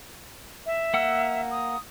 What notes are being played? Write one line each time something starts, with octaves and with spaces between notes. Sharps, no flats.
E5
A#3 F#5 E6
D#6